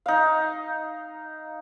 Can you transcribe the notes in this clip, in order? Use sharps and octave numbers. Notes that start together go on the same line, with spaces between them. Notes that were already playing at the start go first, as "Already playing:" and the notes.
D#4 F5